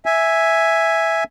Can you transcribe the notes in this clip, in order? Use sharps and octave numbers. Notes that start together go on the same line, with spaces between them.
E5 G#5